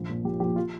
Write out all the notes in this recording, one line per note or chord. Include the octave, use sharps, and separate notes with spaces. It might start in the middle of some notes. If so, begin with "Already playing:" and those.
Already playing: A#1
A#2 F3
A#1 G4
A#2 F3 G4
F4